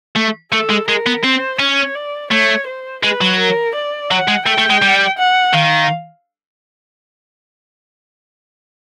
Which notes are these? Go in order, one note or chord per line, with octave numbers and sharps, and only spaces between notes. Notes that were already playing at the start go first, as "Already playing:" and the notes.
A3
A3 A4
G#3
G#3 A#4
B3
C4 C5
C#4 C#5
D5
A3 C#5
C5
G#3 B4
F#3
A#4
D5
F#3 F#5
G#3
A3 G5
A3
G#3
G3
F#5
D#3 F5